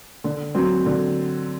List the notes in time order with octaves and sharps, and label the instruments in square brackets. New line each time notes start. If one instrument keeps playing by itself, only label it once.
[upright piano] D3
F#3 C4
D3